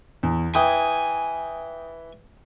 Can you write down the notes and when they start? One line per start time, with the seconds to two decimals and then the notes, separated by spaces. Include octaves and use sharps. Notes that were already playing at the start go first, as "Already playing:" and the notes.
0.23 E2
0.55 E3 G5 G#5 D#6